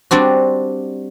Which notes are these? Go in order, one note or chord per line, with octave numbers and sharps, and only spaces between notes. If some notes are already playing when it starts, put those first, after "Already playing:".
G3 C4 D4 F#4